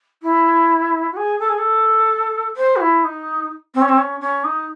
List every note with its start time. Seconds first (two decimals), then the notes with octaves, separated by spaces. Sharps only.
0.22 E4
1.12 F#4
1.16 G#4
1.39 A4
1.49 G#4
1.58 A4
2.56 C5
2.76 F#4
2.80 E4
3.04 D#4
3.74 C4
3.81 C#4
3.88 C4
3.97 C#4
4.20 C#4
4.44 D#4